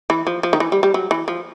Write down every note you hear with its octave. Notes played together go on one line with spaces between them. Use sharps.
E3
F3
F3
D#3
E3
G3
G3
F#3
E3
F3